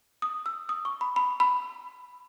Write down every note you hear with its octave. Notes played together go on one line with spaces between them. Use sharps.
D#6
E6
D#6
C#6
B5
B5
B5